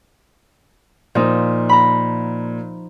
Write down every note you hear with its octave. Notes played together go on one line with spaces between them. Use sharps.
A#2 F3 D#4
A#5 B5